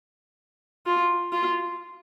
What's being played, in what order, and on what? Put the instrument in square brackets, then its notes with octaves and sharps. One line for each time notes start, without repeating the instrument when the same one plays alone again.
[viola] F4
F4